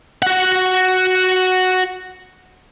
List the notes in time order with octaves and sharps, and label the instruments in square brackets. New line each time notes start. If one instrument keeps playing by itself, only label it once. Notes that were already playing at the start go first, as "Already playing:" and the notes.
[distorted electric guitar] F#4 F#5